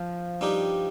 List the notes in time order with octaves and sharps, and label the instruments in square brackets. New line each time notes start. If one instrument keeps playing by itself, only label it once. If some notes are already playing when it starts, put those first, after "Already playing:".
Already playing: [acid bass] F3
[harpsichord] G2 G3 D#4 G4